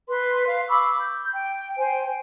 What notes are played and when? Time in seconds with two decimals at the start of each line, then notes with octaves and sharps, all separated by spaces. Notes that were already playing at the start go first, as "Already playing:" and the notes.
0.08 B4 C6
0.46 F5
0.68 B5 C#6 D6 E6
0.99 G6
1.33 G5
1.77 C5 G5 G#5